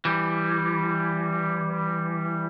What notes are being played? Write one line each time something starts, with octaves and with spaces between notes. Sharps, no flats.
E3 G3